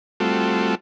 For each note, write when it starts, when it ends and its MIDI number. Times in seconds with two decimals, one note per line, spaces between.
0.20 0.75 55
0.20 0.75 57
0.20 0.75 60
0.20 0.75 65
0.20 0.75 66
0.20 0.75 69